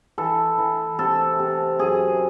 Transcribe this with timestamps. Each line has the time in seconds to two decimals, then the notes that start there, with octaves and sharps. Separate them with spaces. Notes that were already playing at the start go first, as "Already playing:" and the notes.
0.18 E3 A4
0.58 E3
0.99 C3 A4
1.39 C3
1.79 F#2 G#4